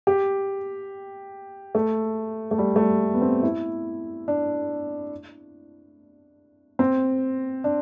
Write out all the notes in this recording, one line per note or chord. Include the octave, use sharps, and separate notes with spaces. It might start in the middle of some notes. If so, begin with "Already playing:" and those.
G4
A3
A3
G3
A3
G3
B3
C4
E4
D4
C4
D4